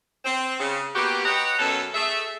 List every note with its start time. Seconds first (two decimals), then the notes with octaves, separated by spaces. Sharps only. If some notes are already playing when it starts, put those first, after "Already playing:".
0.25 C4
0.59 C#3
0.95 A#3 B3 F#4 G4
1.25 B4 C#5 D#5 F#5 G5 A#5
1.59 F#2 B2 C#4 A4
1.94 A3 G#4 E5